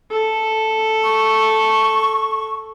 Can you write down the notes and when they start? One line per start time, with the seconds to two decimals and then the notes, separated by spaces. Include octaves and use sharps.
0.11 A4
1.04 C#6